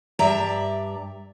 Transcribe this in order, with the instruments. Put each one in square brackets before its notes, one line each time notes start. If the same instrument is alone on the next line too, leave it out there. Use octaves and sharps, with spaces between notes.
[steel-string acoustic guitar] G2 D5 E5 A#5